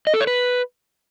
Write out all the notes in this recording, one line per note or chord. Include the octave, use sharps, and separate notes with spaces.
D#5
A4
C#5
B4